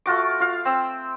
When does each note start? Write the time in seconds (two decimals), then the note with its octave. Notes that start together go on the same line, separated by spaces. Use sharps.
0.06 A3 F4 F#4 D6
0.40 F4 F5
0.65 C4 E6